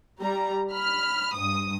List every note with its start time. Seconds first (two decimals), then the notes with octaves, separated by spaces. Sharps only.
0.19 G3 A#5
0.71 B5 F6
1.35 G2 D#6